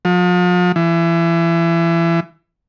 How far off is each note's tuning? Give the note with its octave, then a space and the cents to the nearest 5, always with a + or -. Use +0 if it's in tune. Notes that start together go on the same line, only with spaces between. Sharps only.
F3 +40
E3 +30